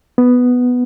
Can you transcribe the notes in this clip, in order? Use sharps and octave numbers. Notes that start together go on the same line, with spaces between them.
B3